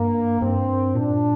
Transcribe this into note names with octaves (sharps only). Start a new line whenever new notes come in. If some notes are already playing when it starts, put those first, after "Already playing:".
Already playing: G2 A#3
G2 C4
A#2 D4